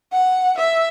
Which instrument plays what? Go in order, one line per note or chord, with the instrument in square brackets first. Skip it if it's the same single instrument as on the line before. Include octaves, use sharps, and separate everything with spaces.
[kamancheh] F#5
E5